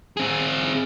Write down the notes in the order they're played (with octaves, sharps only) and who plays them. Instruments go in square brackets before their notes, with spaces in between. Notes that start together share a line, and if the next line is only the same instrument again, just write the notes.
[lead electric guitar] C4 G#4